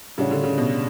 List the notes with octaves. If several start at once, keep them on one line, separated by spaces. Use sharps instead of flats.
A2 C#3 G3 D4 F#4 C#5
D3
C#3
B2